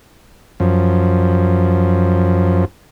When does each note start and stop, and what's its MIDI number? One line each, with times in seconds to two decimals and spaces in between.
0.60 2.65 42
0.60 2.65 53